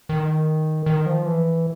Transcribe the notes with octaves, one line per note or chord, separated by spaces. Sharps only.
D#3
D#3
F3
E3